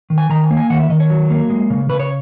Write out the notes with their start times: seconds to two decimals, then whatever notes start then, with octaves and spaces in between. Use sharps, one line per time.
0.10 D#3
0.18 G#5
0.30 D#3 A#5
0.44 G#5
0.51 A#3
0.57 G#5
0.70 D#3 F#5
0.79 E5
0.90 D#3 D#5
1.00 C#5
1.10 F#3
1.30 A#3
1.50 G#3
1.70 C#3
1.89 C#3 B4
2.00 C#5